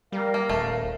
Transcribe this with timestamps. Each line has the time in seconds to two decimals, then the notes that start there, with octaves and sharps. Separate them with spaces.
0.12 G3 A#4 F5
0.34 A#3
0.49 D#1 A3